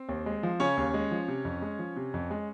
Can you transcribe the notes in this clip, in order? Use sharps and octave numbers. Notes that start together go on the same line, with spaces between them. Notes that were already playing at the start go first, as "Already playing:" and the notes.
Already playing: C4
D#2
G#3
F3
C#3 C#4 C#5
D#2
G#3
F3
C3
F2
G#3
F3
C3
F2
G#3